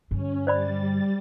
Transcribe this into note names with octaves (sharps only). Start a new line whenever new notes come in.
G2 D3 C#4
G3 C5 D5 B5 A6